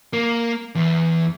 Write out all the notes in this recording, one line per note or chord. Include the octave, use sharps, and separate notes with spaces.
A#3
E2